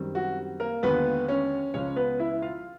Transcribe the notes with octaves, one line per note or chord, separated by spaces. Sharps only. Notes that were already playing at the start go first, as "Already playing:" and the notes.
Already playing: F#2 D#3 G3 C4
F#4
A#3 A#4
D#2 D3 F3 G#3 B3 B4
C#4 C#5
C#2 C#3 F3 G#3 C#4 C#5
B3 B4
E4 E5
F4 F5